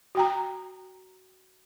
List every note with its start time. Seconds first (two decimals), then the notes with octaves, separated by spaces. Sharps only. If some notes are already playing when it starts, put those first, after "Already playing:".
0.15 F#4 G5 A#5